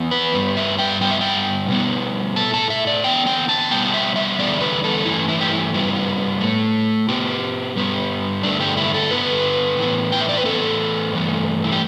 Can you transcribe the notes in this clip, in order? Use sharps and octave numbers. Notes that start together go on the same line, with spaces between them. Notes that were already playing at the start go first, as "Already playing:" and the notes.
Already playing: E2 E3 B3
B4
G2 G3 B3
E5
G5
G2 G3 B3 G5
E5
G5
B2 G3 B3
A2 A3 A5
A5
E5
D5
E2 D3 B3 G5
G5
A5
B2 G3 B3 G5
E5
E5
E2 D3 G3 B3 D5
B4
A4
G2 E3 A3 E4
E4
G4
E4
G2 G3 B3 E4
A2 A3
B2 B3 G4
G2 G3 B3
G2 D3 A3 D4
G4
E4
A4
G2 D3 G3 B3 B4
A2 E3 B3
G5
E5
D5
B4
A2 E3 B3 A4
G2 E3 A3
E4
G4